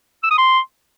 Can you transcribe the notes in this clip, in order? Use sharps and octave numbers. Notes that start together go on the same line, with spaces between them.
E6
D#6
C6